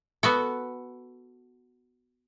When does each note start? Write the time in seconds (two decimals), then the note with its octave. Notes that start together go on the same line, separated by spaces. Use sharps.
0.23 B3 F#4 A4